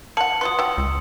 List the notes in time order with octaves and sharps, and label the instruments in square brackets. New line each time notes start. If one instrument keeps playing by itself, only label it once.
[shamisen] A#3 F#5 [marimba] A5 [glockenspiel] C#7 F#7
[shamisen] F#3 F4 B4 [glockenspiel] C6 D#6
[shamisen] F#3 G5 [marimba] E6
[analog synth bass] C#2